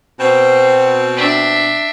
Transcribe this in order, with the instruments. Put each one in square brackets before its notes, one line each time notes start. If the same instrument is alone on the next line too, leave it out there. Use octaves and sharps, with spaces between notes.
[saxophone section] B2 C4
[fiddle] D4 E5